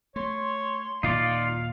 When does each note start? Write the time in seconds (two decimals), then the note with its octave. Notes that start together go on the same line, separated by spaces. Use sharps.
0.16 A3 C#5 C6
1.03 D#1 A#2 D#4 F4 D5 F5